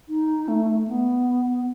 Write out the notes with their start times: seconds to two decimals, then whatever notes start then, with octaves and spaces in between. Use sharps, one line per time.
0.09 D#4
0.48 A3
0.88 B3